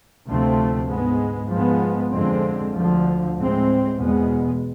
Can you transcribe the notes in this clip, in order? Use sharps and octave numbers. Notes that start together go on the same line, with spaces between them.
D2 C3 F3 A3 C4
G#2 G#3 B3
G#2 F3 G#3 B3
F2 D3 G#3 C4
D2 D3 F3
A2 G#3 C4
E2 B2 G#3 B3